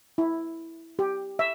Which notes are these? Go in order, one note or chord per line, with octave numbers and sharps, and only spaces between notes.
E4
G4
E5